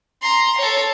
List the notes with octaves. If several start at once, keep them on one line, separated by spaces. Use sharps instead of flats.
A#5 C6
A4 C#5